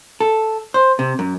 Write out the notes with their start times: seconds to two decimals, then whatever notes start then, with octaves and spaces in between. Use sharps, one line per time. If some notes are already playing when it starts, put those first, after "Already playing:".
0.20 A4
0.74 C5
0.99 C3
1.19 F#2